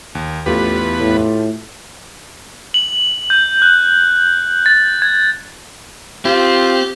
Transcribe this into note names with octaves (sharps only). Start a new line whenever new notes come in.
D#2
A1 E2 A3 B3 F4 G4 B4
A2
F#7
G6
F#6
A6
G#6
C4 F4 G4